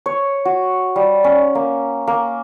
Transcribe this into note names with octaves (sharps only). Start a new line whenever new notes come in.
C#5
F#4
G3
C#4
A#3
A#3